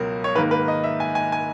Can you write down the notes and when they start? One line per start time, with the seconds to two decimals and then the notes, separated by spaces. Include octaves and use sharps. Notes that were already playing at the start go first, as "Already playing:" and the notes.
Already playing: C#2 B2 F#3 A#4
0.24 C#5
0.35 G#2 D#3 A#3 B4
0.51 B4
0.68 D#5
0.84 E5
1.00 G#5
1.15 G#5
1.32 G#5